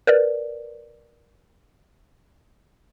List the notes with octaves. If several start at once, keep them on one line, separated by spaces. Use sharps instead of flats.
A#4 B4 D5